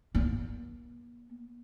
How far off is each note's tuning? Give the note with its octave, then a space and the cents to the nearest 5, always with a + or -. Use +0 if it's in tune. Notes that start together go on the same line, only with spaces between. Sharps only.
A#3 +45